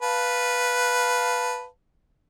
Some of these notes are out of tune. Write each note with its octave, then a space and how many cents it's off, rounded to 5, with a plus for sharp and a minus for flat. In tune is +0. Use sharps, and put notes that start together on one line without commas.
B4 +0 F5 +0 A5 +0